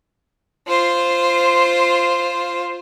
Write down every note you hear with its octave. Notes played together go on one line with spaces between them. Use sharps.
F4 C5